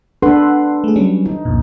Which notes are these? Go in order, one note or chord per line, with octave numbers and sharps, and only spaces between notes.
D4 A4 B4 F#5 C6
A3 G#4
F#3 G3 C#4
D#4
C2 F2 A#2